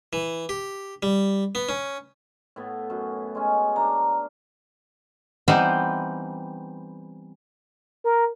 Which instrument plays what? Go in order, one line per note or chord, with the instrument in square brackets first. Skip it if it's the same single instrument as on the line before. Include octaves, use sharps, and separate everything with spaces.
[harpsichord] E3
G4
G3
B3
C#4
[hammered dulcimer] A2 B3
F#2
G#3 C#4
[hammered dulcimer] D4 F5 [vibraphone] A#5
[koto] E3 G3 B3 C4 D#4 C5
[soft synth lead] A#4